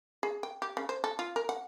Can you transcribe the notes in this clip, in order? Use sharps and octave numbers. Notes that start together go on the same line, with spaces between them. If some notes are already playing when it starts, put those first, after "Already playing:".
G#4
G5
G4
C#3
C5
A4
F4
A#4
F#5